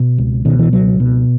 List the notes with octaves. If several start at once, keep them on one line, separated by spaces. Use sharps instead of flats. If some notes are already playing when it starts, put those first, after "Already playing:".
Already playing: B2
C#2
B2 D#3
E3
C#2 F#3
B2